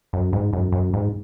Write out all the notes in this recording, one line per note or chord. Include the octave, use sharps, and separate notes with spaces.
F#2
G#2
F#2
F#2
G#2